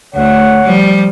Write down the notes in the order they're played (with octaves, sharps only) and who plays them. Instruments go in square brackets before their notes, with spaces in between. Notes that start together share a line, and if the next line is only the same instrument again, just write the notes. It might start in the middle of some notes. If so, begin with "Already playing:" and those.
[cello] D2 A3 [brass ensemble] C#5 F#5
[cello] F3 G3